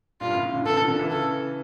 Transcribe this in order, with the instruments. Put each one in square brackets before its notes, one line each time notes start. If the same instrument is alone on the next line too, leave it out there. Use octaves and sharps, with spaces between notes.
[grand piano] G2 A#2 [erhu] F4
[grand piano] A2 C#3
A2 C#3
A#2 D3
[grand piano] C#3 E3 [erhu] A4
[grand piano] A#2 D3
A#2 D3
C#3 E3
[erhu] A4